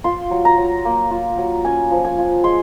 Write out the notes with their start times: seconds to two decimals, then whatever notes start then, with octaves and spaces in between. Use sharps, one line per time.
0.04 F4 C6
0.31 F#3
0.45 A#5
0.58 F#3
0.85 A#3
1.11 F4
1.38 F#3
1.64 C#4 G#5
1.91 F3
2.05 G#5
2.18 F4
2.44 G#3 C6